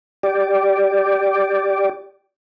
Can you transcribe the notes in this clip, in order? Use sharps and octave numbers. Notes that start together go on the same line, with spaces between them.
G4 D5